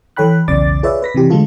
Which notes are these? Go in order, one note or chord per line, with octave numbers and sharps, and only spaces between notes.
E3 A4 C#5 G5 B5 F#6
B1 E2 C#3 D5 D6 A6
F4 G#4 B4 C#5 D5 E5
B4 A#6 B6
C3 E3 G4
D3 G#3 A3 F4 A4